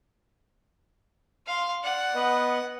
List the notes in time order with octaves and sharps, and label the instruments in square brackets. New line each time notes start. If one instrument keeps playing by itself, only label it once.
[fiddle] F5 C6
[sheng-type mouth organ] D5 [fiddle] F#5
[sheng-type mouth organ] B3 B4 D#5